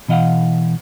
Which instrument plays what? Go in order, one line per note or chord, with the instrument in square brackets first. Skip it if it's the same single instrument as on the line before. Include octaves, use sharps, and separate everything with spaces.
[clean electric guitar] B2 E3 D#5 F5 F#5